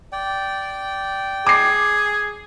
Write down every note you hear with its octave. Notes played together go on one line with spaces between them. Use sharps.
D5 G5
G#4 D6 C7